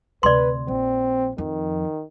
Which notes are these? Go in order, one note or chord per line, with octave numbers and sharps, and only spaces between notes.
D2 C3 B4 D5 C6
A#1 C4
F2 D#3